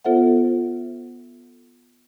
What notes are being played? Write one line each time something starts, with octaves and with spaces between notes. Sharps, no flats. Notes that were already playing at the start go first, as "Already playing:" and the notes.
B3 F4 A4 C5 E5 F#5